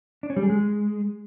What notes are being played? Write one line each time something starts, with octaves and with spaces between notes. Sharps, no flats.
D4
C#4
G3
G#4
G#3